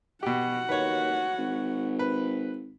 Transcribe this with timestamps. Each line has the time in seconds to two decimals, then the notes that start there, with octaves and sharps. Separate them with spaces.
0.23 B2 F#4 G4 F#5
0.69 D#2 B4 C#5
1.38 G#1
1.99 B4